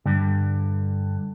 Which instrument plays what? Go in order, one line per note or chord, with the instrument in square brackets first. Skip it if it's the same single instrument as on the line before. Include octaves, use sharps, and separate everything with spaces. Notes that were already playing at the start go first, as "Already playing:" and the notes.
[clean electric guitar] G2 [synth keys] D3